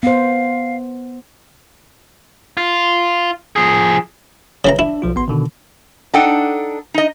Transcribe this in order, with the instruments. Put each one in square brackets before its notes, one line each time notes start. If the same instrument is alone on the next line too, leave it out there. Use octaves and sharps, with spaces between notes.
[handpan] B3 C5 [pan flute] F5
[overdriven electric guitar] F4
F3 G#4
[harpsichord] C#3 E3 A#5
[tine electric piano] D4 [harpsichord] E4
[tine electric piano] B1 F3 F4
G#1 B3 C6
B2 D3 D#3
[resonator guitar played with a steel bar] D4 D#4 A4 F#5 G5
D#4 D#5